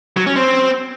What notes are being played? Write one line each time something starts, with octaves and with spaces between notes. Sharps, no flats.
F#3
C#4
C4